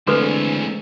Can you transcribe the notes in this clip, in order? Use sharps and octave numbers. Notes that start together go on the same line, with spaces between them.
D3 E3 G#3 A3 C4 A4 B4 C6